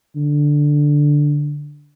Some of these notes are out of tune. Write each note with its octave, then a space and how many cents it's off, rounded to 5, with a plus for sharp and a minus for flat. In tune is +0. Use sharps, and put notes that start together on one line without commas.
D3 +0